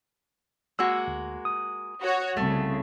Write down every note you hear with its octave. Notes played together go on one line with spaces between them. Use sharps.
G#3 A#3 F#4 E6
D2
D#6
F#4 C#5
C2 C#3 A3